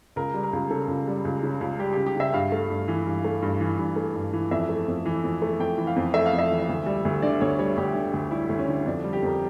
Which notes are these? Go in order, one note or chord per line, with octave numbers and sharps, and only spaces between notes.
C#2 A#4
G3
A#4
C#2
C#3 A4
C#2
G3
C#2
C#3
C#2
G3 G4
C#2 G4
G4
C#3 E5
G2 F5
A3
G2
E3
G2
A3
G2
E3
G2
A3
G2
E3
F2 E5
A3
F2
E3
F2
A3
F2 G5
E3
F5
F2
A3 E5
F5
F2
E5
E3
D2
G3
D2
D3 D5
D2 C#5
G3 C#5
D2 G4
D3
D2
G3 E4
D2
C#4
D3
F2 D4
G3
G4
F2 A#4